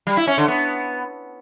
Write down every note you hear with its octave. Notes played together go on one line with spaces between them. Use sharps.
G3
E4
C#4
D3
B3